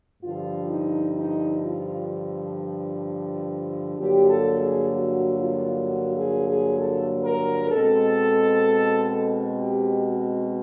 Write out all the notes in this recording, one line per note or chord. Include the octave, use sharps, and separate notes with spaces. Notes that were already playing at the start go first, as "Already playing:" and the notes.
G2 D3 F3 F4
D#4
D#4
F4
G2 D3 F#3 A#3 G4
A4
G#4
F#4
F4
F#4
G#4
G#4
A4
A#4
B2 G#3 C4 A4
G4
F#4